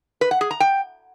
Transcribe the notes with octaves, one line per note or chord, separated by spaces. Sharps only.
B4
F#5
G#4
A#5
G5